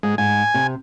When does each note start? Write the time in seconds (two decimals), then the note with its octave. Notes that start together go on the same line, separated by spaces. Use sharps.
0.03 G#2 G#3
0.18 G#2 G#5
0.54 C3